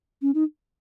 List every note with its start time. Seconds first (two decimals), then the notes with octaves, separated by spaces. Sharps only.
0.22 C#4
0.35 D#4